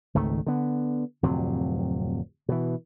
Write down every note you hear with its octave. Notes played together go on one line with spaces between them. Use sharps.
G#1 C#2 D#3 A3
D3 B3
D1 F2 C3 F#3
B2 E3